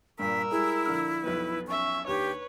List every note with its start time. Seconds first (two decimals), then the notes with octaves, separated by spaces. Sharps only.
0.19 G2 A#2 A#4 E6 B6
0.51 G3 G#3 E4 G#4
0.85 A#1 D3 F6
1.24 B1 F2 B3 B4
1.67 C#4 E5 C#6
2.07 D#2 D4 G4 B4 C#5